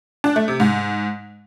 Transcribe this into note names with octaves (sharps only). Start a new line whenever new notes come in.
D4
A3
C3
G#2